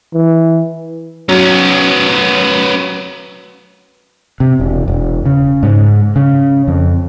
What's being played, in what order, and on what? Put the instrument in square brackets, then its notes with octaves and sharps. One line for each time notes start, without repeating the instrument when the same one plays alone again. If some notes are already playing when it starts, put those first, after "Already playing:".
[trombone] E3
[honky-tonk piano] F#3 [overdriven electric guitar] B3 C#4
[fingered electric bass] C3
E1
E1
C#3
G#2
C#3
F2